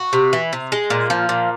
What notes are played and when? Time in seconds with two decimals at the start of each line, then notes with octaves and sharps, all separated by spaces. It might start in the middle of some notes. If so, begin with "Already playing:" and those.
Already playing: F#4
0.13 C3
0.33 E3
0.53 C3
0.72 G#3
0.90 A#2
1.10 F3
1.29 A#2